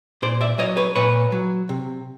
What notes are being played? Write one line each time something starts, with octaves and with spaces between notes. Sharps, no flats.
A#2 C5 D5
D5 E5
F#3 C#5 D#5
B4 C#5
A#2 B4 C#5
F#3
C3